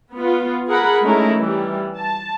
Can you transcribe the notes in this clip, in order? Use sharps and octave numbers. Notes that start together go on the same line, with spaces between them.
B3 F4
G#4 A#4 F#5 B5
G#3 A3 C#4 D#4 E4 A#4
E3 G3
A5